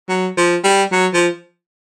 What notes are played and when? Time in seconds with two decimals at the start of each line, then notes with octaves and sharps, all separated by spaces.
0.09 F#3
0.37 F3
0.64 G3
0.92 F#3
1.13 F3